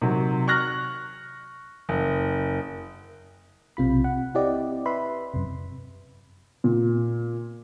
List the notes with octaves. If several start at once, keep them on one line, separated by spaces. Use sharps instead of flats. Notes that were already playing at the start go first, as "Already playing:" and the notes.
C3 D#3 F#3
C#6 F6 F#6 A#6
F#1
B1 C3 F4 B5
F#5
C4 E4 G4 D5 D#5
B4 E5 B5 C6
F#2 C3
A#2